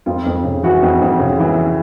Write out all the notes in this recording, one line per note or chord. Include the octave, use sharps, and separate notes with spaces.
F2 F4
F2
C#3
E3 F#4
F2
F2
C#3
E3